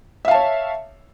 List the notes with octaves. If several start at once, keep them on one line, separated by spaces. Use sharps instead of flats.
C#5 E5 F5 A5